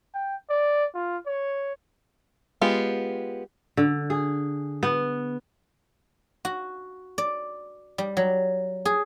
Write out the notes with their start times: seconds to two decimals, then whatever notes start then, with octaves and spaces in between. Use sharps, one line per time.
0.14 G5
0.50 D5
0.95 F4
1.26 C#5
2.61 G#3 B3 F4 G4
3.77 D3
4.10 G#4
4.83 B3
6.45 F#4
7.18 D5
7.98 G3
8.17 F#3
8.85 G#4